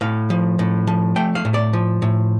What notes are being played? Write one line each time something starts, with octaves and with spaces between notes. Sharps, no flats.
A2 F5
F3
A2
F3
A3 G5
F5
A2
D5
F3
A2